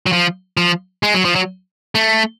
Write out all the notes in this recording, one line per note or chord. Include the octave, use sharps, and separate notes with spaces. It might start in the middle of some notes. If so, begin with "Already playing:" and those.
F#3
F3
F3
G#3
F#3
F3
F#3
A3